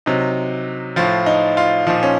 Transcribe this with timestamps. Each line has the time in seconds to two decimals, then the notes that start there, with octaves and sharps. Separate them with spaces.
0.06 C3 F#3 D#4
0.96 A2 F3 F4
1.26 D#4
1.57 F4
1.87 A#2 F3 D#4
2.03 C#4